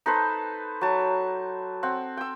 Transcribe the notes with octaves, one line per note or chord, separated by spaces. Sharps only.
D#4 A4 B4 C5
F#3 A5
C4 F#5
G5 E6